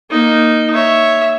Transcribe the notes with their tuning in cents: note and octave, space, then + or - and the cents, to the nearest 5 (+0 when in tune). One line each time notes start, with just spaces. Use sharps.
A#3 +0 D#4 +0
C#5 +0 E5 +0